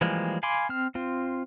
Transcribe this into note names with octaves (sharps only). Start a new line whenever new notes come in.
E3 F3 G3 G#3 A#3
F5 G#5 B5 C6 D6
C4 F6
C4 F4